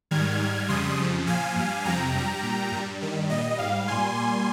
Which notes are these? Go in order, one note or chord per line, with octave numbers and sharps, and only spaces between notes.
G#2 D#3 G3 F6 G#6
G#2 G3
F2 C#3 G3 C6 D#6
F2 C#3 F3
A#2 F3 F5 G#5
G2 G3
F2 C3 F3 G5 A#5
G2 G3
A#2 G3
G2 G3
G2 D#3 G3
A#2 G3 D#5
G#2 G3 F5
A#2 G3 G#5 C6
A#2 G3